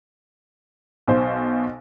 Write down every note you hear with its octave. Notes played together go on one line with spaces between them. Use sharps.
B1 B2 C5